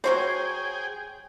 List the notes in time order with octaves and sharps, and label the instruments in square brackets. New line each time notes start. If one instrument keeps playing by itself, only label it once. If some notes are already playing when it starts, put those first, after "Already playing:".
[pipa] F#3 F#4 C5 [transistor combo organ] G#4 G5 [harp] C#5